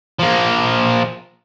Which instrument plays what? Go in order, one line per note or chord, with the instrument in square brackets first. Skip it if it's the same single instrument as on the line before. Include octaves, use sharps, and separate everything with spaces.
[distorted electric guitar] F3 A#3